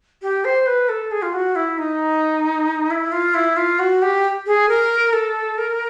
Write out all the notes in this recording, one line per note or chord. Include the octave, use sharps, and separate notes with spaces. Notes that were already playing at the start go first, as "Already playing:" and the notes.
G4
C5
B4
A4
G#4
F4
F#4
E4
D#4
E4
F4
E4
F4
F#4
G4
G#4
A#4
A4
A#4